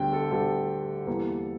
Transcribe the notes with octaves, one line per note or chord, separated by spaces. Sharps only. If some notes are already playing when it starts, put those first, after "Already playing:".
Already playing: D2 D3 G3 G5
A4
D2 D3 G3 A4
E2 E3 G3 A#3